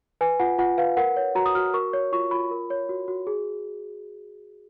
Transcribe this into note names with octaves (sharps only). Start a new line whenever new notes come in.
B4 G#5
F4 F#5
F4 F#5
B4 F5
A#4 F#5
C#5
F#4 A#5
D#6
F#4 F6
A#4 C#6
C#5
F4 C#6
F4 B5
A#4
C#5
F#4
F#4
G#4